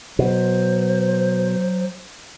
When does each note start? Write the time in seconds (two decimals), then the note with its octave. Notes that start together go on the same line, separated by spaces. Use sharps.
0.19 B2 F#3 C5